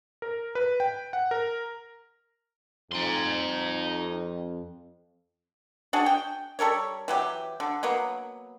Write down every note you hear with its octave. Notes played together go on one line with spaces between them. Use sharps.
A#4
B4
G5
F#5
A#4
F2 D#4 C6
D4 F#4 G#4
G5
G3 A4 A#4 C#5
E3 F#3 G4
D3
F#3 A#3 B3